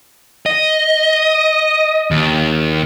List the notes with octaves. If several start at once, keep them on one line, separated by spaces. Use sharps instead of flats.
D#5
D#2